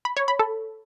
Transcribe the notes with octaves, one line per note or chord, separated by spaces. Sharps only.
B5
C#5
B5
A4